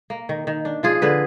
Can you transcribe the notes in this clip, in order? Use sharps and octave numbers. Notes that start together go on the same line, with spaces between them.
A#3
D#3
D#3
D4
F3 F4 G#4
D3 G#4 B4